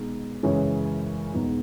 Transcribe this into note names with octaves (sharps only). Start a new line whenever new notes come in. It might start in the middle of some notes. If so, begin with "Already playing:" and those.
Already playing: B2 G#3 D#4 G#4
F#2 C#3 E3 G#3 C#4
E2 B2 G#3 B3 D#4